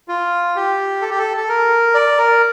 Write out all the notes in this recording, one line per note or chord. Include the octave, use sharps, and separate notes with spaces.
F4
G4
A4
G4
A4
A4
A#4
D5
A#4